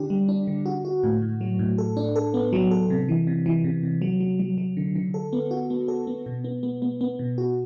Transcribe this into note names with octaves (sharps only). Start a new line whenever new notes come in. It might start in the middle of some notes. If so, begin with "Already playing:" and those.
Already playing: D3 D4 G4
G3
D4
D3
F#4
F#4
A2
A2
F#3
A2
A4
D4
A4
B3
F#3
A4
C3
E3
C3
E3
C3
C3
F#3
F#3
F#3
F#3
D3
D3
A4
B3
F#4
B3
A4
B3
B2
B3
B3
B3
B3
B2
F#4